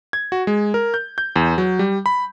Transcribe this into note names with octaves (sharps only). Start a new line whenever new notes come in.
G#6
F#4
G#3
A#4
G6
G6
E2
F#3
G3
B5